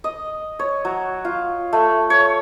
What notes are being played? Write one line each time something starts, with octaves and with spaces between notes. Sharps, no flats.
D#5
C#5
F#3
F4
A3
C#5